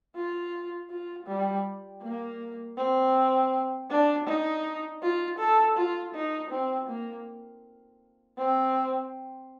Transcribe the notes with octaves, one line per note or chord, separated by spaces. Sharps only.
F4
F4
G3
A#3
C4
D4
D#4
F4
A4
F4
D#4
C4
A#3
C4